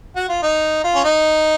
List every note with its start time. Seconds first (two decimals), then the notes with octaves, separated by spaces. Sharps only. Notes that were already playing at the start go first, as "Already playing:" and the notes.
0.16 F#4
0.29 F4
0.43 D#4
0.84 F4
0.95 C#4
1.04 D#4